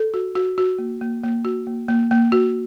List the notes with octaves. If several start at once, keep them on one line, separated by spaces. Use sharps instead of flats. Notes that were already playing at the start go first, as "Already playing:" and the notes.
Already playing: A4
F#4
F#4
F#4
A#3
A#3
A#3
F#4
A#3
A#3
A#3
F#4